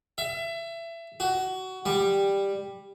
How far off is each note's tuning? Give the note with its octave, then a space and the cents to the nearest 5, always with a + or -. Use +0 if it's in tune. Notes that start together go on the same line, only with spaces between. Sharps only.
E5 +25
F#4 +20
G3 +10